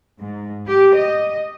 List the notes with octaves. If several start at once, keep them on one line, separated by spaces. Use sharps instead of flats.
G#2
G4
D#5